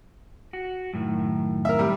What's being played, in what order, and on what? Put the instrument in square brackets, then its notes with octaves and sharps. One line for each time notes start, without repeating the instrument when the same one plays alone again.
[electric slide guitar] F#4
F#2 A2 D#3
[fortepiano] A#4 E5
G3